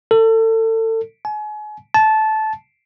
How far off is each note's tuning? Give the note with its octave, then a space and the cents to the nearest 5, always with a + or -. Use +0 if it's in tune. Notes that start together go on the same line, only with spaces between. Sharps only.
A4 +30
G#5 +35
A5 -15